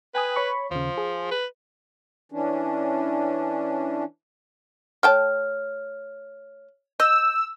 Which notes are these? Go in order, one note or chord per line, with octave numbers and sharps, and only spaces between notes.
B4 G5 G#5 D#6
C#5 B5 C#6
D#2 C#3 F3
G#4
B4
E3 C#4 D4
A3 C#5 G5 A5 F6
D#5 E6 G6